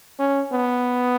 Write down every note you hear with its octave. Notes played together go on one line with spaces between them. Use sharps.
C#4
B3